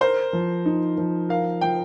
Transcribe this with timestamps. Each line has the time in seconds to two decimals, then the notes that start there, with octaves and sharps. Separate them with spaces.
0.01 A#4 C5
0.33 F3
0.66 D#4
0.98 F3
1.29 A#4 F5
1.61 F3 G5